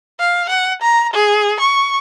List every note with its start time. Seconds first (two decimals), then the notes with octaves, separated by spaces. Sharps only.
0.20 F5
0.49 F#5
0.82 A#5
1.14 G#4
1.60 C#6